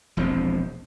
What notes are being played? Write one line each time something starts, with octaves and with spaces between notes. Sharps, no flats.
E1 A#1 E2 C4